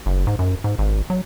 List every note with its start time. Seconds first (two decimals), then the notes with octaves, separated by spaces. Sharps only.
0.06 F#1
0.27 G#2
0.39 F#2
0.64 G#2
0.79 G#1
1.10 F#3